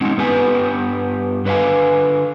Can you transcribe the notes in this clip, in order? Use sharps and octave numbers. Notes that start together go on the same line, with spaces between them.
G#3 C4 C#4 D#4
G2 B3 G4 B4 G#5
D3 B4 D5 F5 G#5